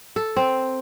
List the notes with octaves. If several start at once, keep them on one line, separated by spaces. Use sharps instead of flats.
A4
C4